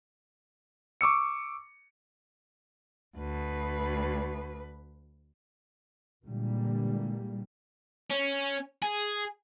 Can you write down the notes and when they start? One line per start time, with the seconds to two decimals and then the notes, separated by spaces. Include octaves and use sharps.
1.01 C#6 D6 E6 C#7
3.18 D2 B4
6.24 A#2 D3 E3 G3 G#3 A#3
8.11 C#4
8.82 G#4